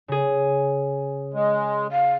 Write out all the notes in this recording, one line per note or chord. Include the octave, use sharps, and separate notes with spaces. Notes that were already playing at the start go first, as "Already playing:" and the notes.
C#3 G#4
G#3
F5